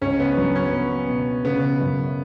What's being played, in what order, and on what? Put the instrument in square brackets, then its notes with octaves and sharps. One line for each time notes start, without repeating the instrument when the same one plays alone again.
[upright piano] C#2 [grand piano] C#4
[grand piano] B3
[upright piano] F#3 [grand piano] B3
[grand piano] C#4
[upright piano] B3
B2
[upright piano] C#3 [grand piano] B3
[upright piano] F#2